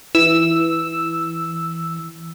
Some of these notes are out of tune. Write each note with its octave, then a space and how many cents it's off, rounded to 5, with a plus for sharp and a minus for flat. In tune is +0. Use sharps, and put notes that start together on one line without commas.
E3 +0 E6 +0